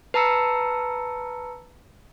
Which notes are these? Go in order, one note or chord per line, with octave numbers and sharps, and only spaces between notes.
B4 A5 A#5 E6 C#7